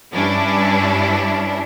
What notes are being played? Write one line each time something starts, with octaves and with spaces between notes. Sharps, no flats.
G2 C#4 D4 E4